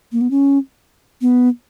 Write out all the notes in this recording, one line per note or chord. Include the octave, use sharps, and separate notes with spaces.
A#3
B3
C#4
B3